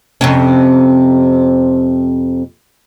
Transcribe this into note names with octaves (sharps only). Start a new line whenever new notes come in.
F2 C3 C#4